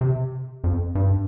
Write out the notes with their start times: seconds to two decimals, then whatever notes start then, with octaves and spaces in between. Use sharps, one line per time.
0.01 C3
0.64 F2
0.95 G2